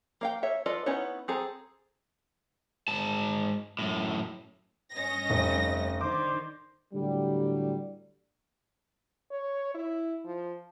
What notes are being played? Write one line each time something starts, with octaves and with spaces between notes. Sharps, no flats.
A#3 F5 G5
A4 C#5 E5
F4 A4 B4 D5 D#5
B3 C#4 D#4 E4 C#5
C4 G#4 A4 A#5
G#2 A5
F#2 A2
G2 C#4 D#5 A#6
F1
D3 D#3 C5 D6
A2 D3 F#3 G3
C#5
E4
F3